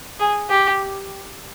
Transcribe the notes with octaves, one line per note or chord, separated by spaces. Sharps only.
G#4
G4